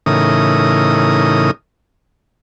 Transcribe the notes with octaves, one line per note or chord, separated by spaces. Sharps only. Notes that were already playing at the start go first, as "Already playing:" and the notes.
A2 C#3 E3 D#4 A#4 D#6